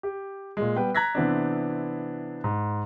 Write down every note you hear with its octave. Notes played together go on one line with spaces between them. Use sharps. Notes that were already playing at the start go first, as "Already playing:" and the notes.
G4
A#2 G#3
G3 B3 B4 G5
A#5 F#6 G#6 A#6 B6
C3 E3 B3 C4 D4
G#2